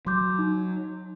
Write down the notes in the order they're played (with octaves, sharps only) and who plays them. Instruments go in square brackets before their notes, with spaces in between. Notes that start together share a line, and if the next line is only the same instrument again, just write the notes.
[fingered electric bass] F#3 [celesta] C6 D6 G6
[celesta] D#4